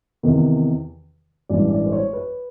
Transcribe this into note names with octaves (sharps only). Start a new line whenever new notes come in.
E2 C3 D#3
A1 G2 E3 G#3 D5
D5
C5
C#5
B4